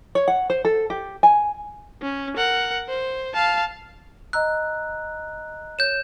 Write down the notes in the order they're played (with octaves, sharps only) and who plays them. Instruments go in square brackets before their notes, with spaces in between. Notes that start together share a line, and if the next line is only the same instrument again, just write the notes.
[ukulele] C#5
F#5
C5
A4
G4
G#5
[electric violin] C#4
A#4 F#5
C5
F5 A5
[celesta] D#5 A#5 E6 [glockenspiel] F#6
[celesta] C#5 [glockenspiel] G6 E7